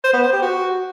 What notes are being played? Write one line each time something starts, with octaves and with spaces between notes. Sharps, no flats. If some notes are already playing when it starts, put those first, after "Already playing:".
C5
B3
C5
G4
F#4